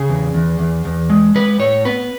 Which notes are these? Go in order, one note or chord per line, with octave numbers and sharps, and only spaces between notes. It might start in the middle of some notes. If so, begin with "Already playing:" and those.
Already playing: C#3 G#4
E2
E2
E2
E2
G#3
G#3 B4
A2 C#5
B3 B4